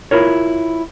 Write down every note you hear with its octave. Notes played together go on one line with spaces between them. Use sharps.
E4 F4 A#4 C#5